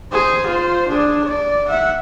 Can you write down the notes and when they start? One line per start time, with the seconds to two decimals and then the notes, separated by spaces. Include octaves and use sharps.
0.12 G#4 C5
0.46 F4 C5
0.88 D4 G#4
1.25 D5
1.68 E5 F#5